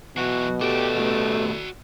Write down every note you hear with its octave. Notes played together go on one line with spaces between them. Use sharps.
B2 E3 F#3 F#4
A3 F#4 G4 D5
A2 G3